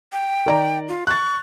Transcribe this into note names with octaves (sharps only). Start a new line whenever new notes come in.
G5
D#3 D5 A#5
F4
C#6 F#6 A6